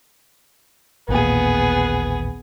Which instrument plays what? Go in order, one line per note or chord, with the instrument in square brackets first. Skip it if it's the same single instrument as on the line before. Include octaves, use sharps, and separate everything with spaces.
[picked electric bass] A1 D#2 A#2 [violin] B3 G#4